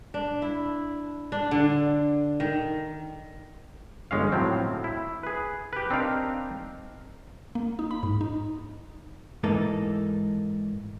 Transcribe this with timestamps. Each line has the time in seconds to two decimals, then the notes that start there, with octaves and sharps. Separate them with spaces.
0.14 D4
0.42 E4
1.32 D4
1.51 D3
2.40 D#3
4.11 G1 G#3 C#4 F5
4.32 A2 F3 F#3 C4
4.84 E4
5.23 G#4 B4
5.73 G4 B4
5.90 C4 D4 D#4 A#4 F5
7.55 A#3
7.79 D#4
7.91 B5
8.03 G#2
8.21 D#4
9.43 G#2 E3 A#3 D#4 A4